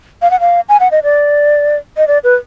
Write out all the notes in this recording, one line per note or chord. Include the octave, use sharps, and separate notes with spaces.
F5
F#5
F5
G#5
F#5
D#5
D5
D#5
D5
B4